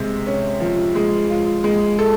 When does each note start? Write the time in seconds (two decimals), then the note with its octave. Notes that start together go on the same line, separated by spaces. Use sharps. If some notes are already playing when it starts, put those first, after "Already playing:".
Already playing: C3 G#3
0.27 C#4
0.60 F3
0.95 G#3
1.30 F4
1.64 G#3
1.99 A4